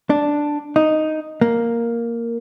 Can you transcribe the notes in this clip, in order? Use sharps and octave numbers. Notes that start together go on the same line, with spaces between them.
D4
D#4
A#3